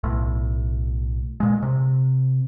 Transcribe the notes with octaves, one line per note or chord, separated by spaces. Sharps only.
B1 A2
A#2 G#3
C3